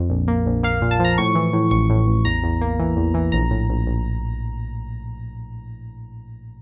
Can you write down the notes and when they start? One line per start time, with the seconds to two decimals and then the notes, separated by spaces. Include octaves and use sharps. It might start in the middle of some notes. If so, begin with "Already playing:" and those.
Already playing: F2
0.10 A#1
0.28 A#3
0.46 A#1
0.63 A#3 F5
0.82 A#2
0.91 A5
0.99 F3
1.04 A#5
1.18 A2 C#6
1.35 E3
1.53 A2
1.71 A1 C#6
1.90 A2
2.08 A1
2.25 E2 A#5
2.44 E2
2.61 A#3
2.79 E3
2.97 E2
3.14 E3
3.32 A#1 A#5
3.51 A2
3.69 A#1
3.86 A#1